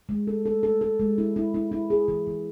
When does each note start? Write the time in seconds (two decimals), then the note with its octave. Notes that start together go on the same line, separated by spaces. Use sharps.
0.09 G#3
0.27 A4
0.46 A4
0.63 A4
0.81 A4
0.99 G#3
1.18 E4
1.36 E4
1.54 E4
1.72 E4
1.90 G#4
2.08 E3
2.27 E3